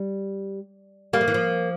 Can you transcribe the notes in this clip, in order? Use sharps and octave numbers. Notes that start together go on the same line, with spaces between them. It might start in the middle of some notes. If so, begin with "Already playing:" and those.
Already playing: G3
G3 A#3
F3
E3
F3